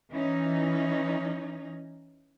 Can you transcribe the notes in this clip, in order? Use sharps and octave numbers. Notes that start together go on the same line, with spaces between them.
E3 C#4 D#4